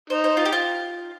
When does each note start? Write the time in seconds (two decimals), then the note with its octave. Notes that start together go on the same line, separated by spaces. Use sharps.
0.10 D#4 C5
0.24 C5
0.37 F4
0.45 G4
0.52 F4